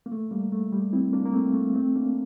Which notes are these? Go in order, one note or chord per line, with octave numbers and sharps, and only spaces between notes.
A#3
A3
G3 A#3
A3
G3
C4 E4
A#3 D4
A#3
A3 C4
A3
A3 C4
A#3 D4